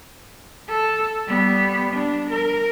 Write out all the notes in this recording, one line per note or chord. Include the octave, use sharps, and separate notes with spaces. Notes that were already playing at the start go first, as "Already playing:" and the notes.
A4
G3 B3
D4
A#4